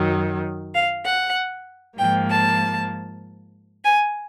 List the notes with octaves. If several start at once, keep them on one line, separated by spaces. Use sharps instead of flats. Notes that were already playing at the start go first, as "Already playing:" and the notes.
Already playing: F#2 D#3 F#3
F5
F#5
G#2 F3 A#3 G5
A5
G#5